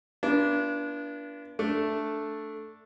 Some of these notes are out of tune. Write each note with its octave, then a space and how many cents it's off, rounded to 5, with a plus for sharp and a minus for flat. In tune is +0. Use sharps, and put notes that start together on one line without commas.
B3 -40 D4 -15 F4 -45
A3 +0 D4 -5